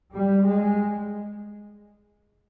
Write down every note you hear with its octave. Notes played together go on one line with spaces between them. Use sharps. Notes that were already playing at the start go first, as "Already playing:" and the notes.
G3
G#3